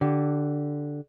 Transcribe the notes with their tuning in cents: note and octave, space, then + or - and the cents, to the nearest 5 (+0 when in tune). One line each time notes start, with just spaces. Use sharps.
D3 +0 G4 -25